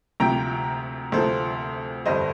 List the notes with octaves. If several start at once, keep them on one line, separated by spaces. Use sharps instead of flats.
D2 C3 F3 G5 A#5
D2 C3 F3 A4 C5
G1 F2 D3 G3 C5 D#5